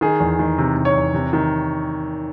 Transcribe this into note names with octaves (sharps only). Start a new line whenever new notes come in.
D#3 G#4
E2
D#3
C3
C3
C#5
E2
C3
D#3